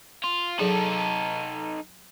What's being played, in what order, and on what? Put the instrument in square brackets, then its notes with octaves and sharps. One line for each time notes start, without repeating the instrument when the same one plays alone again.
[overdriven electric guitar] F4
[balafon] F#3 G#4 [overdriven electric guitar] D#4 A4